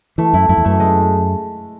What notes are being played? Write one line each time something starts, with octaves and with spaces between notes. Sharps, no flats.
E3 A3
F#2 E4
F#2 E4
E2
F#2 A3
G#3